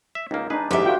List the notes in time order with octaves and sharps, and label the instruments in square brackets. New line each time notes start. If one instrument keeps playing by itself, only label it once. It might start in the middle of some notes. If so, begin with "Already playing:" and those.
[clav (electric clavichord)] E5
[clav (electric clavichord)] C#2 A#3 [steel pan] D#4
[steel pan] D4 D#4 [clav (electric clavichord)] G#4 B4
[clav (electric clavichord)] A1 D2 G#2 [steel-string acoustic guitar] G4 E5
[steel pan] F4 F#4 G5